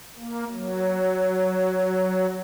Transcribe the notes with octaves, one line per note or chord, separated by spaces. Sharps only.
A#3
F#3